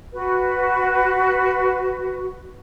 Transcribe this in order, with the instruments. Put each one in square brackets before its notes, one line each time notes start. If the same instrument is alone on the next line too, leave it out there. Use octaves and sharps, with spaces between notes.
[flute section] F#4 B4